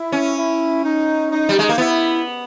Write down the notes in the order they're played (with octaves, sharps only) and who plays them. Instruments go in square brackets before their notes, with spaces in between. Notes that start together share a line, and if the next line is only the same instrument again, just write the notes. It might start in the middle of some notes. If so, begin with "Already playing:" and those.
Already playing: [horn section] E4
[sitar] C#4
[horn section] E4
D#4
D#4
[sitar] G3
G#3
A#3
[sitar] B3 [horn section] E4